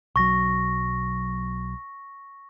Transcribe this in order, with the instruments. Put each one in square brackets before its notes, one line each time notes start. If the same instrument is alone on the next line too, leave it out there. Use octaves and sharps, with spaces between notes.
[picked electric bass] B1 F#3 [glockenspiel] C#6 A#6